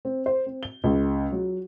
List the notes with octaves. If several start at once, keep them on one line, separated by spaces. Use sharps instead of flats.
C4
C5
C4
G7
C#2
F#3